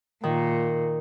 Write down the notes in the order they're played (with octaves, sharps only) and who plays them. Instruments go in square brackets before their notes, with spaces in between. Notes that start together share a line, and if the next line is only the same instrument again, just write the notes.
[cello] A#2 [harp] D#3